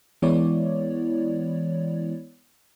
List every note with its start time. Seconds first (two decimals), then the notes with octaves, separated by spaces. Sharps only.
0.22 E3 G#3 B3 E4 C#5 D5